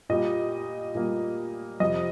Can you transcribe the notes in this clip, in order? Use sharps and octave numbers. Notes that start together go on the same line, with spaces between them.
A#2 G3 A#3 D#5
A#2 G3 A#3
F2 C3 G3 D#5